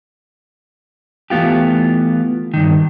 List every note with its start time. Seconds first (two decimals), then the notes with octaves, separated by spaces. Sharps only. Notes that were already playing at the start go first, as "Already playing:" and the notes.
1.30 E3 A3 B3 F4 G4
2.54 G2 D#3